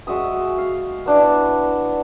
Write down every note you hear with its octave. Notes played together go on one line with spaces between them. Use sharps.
G#3 F#4 E5 D#6
F5
B3 D4 E4